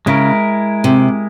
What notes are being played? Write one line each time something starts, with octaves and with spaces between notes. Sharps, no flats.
C#3 G#3 E4 A#4
C3